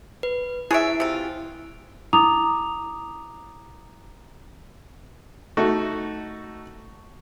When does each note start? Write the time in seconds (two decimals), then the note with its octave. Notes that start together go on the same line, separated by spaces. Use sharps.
0.23 B4
0.71 E4 G#4 C#5 E5 D7
1.00 C3 F4
2.13 E4 A#5 D6 D#6 F7
5.57 A3 D#4 F#4